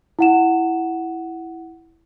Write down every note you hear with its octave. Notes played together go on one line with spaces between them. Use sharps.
E4 F#5 E7